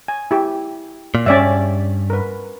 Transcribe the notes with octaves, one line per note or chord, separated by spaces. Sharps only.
G#5
E4 G4
A#2 F5
G2 C#4 D5 E5
A#4 B4